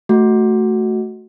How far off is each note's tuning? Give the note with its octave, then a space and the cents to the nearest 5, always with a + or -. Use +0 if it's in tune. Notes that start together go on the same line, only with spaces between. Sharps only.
A3 +0 F#4 +0